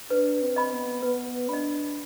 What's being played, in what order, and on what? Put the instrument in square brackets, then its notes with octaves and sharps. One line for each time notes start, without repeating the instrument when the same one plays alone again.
[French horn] D4 [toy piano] B4
[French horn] C4
[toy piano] D#5 B5
[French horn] B3
[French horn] B3 [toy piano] B4
[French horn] D4 [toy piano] D#5 B5